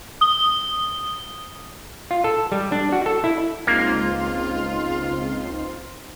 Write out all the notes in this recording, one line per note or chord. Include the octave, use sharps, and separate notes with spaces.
D#6 G7
F4
A4
G3
D4
F#4
A4
E4
C#2 A#3 C4 D#4 F4 C6